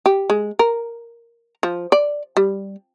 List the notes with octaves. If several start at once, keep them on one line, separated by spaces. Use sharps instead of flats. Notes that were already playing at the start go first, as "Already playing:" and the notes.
G4
G#3
A#4
F3
D5
G3